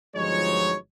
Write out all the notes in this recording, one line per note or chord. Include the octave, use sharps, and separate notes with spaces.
G1 F3 F#3 G#3 D#4 C#5